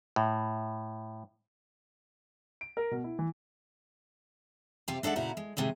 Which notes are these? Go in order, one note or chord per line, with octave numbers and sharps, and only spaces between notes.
A2
D7
A#4
B2
E4
E3
C3 C4 F4 G4
G#3 D4 A4 E5 F#5
A#2 C#3 E4 F#4 A#5
G#3
D#2 A2 C3 G#3